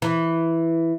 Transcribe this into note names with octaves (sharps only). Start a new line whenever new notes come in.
E3